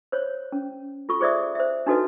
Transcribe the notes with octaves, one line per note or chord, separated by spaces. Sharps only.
C5 C#5
C#4
F4 A4 C#6
G#4 C5 D5 E5 D#6
C5 E5
D4 D#4 F#4 A4 B4 D#5